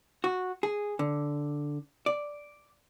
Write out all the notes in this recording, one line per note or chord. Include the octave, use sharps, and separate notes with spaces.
F#4
G#4
D3
D5